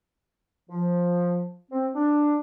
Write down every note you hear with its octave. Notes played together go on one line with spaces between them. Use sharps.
F3
C4
D4